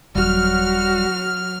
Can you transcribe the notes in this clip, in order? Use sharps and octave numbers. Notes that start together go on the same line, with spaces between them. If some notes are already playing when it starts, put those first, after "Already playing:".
D#1 F#3 G3 F#4 F6